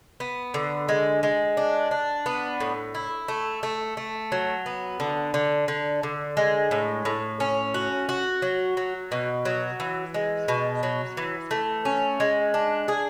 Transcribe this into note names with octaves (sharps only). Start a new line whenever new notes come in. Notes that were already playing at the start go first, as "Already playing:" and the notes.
B3
D3
G#3
G#3
D4
D4
B3
A2
E4
A3
A3
A3
F#3
B3
D3
D3
D3
D3
G#3
A2
A2
C#4
F#4
F#4
F#3
F#3
B2
F#3
E3
G#3
B2
F#3
E3
A3
C#4
G#3
D4
G#4